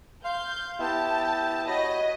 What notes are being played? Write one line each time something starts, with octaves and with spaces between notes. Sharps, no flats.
F5 C6 G6
B3 E4 G4 A5
F#4 C#5 D#5 B5